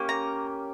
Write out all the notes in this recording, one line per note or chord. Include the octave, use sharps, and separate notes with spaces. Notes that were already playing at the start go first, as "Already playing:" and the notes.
Already playing: A#3 C#4 G4
A#5